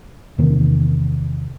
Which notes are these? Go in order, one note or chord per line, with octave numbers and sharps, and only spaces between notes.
E2 C3 D#3 A#3